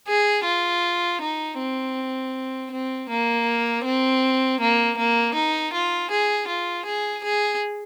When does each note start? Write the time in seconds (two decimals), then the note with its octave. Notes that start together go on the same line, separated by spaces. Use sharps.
0.08 G#4
0.45 F4
1.21 D#4
1.59 C4
2.72 C4
3.10 A#3
3.85 C4
4.60 A#3
4.98 A#3
5.35 D#4
5.73 F4
6.11 G#4
6.48 F4
6.86 G#4
7.24 G#4